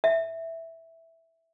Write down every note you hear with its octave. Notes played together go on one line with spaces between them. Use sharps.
E5